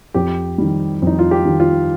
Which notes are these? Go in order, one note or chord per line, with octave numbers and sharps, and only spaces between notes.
F2 G4
D#3 G3
F2 D#4
F4
G4
D#3 G3
F4